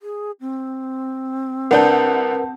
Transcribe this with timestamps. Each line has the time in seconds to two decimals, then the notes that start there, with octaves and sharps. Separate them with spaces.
0.02 G#4
0.41 C4
1.71 C2 D4 A#4 B4 F#5 A5 G6